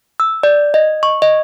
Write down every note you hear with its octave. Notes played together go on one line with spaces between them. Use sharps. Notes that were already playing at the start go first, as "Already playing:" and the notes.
E6
D5
D#5
C#6
D#5